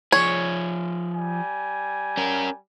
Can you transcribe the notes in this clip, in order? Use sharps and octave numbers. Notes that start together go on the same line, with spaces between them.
F3 G#4 C#5
G3 G#5
C#4 A#4